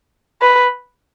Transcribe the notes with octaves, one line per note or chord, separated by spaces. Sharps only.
B4